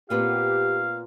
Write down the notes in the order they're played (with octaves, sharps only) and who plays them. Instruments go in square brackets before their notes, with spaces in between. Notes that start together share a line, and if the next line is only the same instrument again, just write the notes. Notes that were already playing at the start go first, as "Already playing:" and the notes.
[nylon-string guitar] A#2 B3 C4 [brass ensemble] G4 [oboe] F5